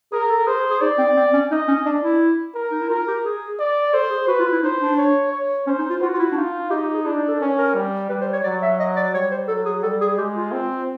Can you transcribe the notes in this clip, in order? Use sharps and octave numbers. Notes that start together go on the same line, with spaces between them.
G#4 A#4
A4
G#4 C5
G#4
G#4
D#4 D5
C4
C4
C#4
D#4 D#5
C#4
D4 D5
E4
A#4
D#4
E4
F4 A#4
G4
G#4
D5
A4 C5
G#4
F#4 B4
F4
E4
D#4 C5
D4
C#5
C#5
C#4 C5
D#4
F4
F4 F#4
F4
E4
D4
D#4 F4
D#4 G4
G4
G#4
D4 E4
D#4
A4
C#4 A#4
A#4
G3
G3 B4
C5
C#5
F#3 D5
E5
D#5
D5
G3 C#5
C5
F#3 A4
G#4
G3 A4
G#4
G#3 G4
F4
C4